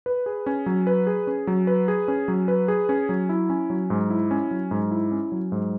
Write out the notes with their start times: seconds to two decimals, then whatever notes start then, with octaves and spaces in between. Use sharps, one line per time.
0.06 B4
0.26 G#4
0.46 C#4
0.66 F#3
0.87 B4
1.07 G#4
1.27 C#4
1.47 F#3
1.67 B4
1.88 G#4
2.08 C#4
2.28 F#3
2.48 B4
2.68 G#4
2.89 C#4
3.09 F#3
3.29 E4
3.50 C#4
3.70 F#3
3.90 G#2
4.10 E4
4.31 C#4
4.51 F#3
4.71 G#2
4.91 E4
5.12 C#4
5.32 F#3
5.52 G#2